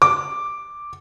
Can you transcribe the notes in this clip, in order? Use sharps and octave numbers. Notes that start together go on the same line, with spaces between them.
D6